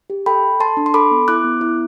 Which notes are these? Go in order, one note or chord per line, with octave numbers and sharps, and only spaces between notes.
G4
A4 G5 B5
A4
A4 A5 C6
D4
C6
A4 B5 D6
B3
E4 D6 F#6
B3
E4